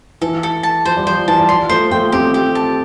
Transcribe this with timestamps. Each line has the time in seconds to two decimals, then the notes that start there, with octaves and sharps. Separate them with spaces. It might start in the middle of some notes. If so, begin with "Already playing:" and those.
0.21 E3 A4
0.43 A4
0.63 A5
0.85 F3 C5
0.97 G3
1.06 F3 C5
1.28 E3 A5
1.39 G3
1.49 F3 C6
1.69 F3 A3 C5
1.91 F3 A3 G5
2.12 A3 C4 G4
2.34 G4
2.55 A5